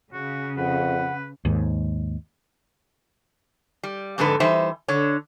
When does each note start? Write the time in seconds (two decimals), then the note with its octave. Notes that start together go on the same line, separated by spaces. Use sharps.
0.13 C#3 F#4
0.57 F2 B4 F#5
1.45 D#2 G#2
3.83 G3
4.18 F2 G#2 D3 A4 B4
4.40 E3 G3 D#4 C5 E5
4.88 D3 C#5